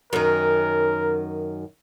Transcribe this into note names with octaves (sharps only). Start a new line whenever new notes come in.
F#2 D#3 A#4